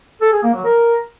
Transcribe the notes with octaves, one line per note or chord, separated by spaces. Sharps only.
A4
G#4
A#3
F#3
A#4